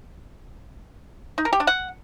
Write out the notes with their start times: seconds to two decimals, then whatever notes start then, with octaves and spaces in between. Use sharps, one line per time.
1.38 D#4
1.45 A#4
1.53 G4
1.60 D4
1.67 F#5